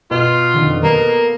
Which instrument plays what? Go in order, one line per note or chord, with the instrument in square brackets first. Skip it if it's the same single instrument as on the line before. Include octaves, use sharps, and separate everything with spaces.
[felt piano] B2 [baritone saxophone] F4
[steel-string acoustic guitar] F2 D3 D#3
[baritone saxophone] A#3 [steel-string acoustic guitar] B3 A4 A#4